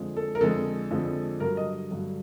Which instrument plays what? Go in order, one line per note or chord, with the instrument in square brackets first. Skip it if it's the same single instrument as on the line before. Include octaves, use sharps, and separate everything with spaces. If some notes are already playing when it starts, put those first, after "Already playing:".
Already playing: [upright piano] F2 D3 F3 G#3
A4
A#4
F2 D3 F3 G#3 A4
F2 D3 F3 G#3
G2 D3 F#3 A#4
D#5
G2 D3 F#3